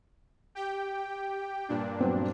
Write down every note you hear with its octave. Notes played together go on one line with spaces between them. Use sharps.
G4 G5
G2 A#2 D4
F#3 B3 C4